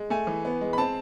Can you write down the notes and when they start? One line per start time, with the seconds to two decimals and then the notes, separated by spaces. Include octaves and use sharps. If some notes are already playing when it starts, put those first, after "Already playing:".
Already playing: G#3
0.10 A3 G#5
0.27 E3
0.45 B3
0.61 G#3
0.73 B5
0.78 C4 A5